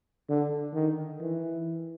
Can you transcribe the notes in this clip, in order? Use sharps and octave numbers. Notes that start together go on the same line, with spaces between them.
D3
D#3
E3